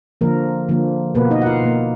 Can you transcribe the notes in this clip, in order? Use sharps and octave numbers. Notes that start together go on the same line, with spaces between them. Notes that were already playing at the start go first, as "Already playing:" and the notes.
D3 F3 A#3 A#4
D3 F3 A#3
B2 A#3 B3 B4
D#4 D#5
F#5
F4 F5
B2 A#3